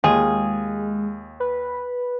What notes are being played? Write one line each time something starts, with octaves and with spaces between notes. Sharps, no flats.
D#2 G#3 F4 G#4
B4